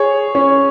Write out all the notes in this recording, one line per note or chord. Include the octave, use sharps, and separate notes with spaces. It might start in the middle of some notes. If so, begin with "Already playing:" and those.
Already playing: G#4 C#5
C#4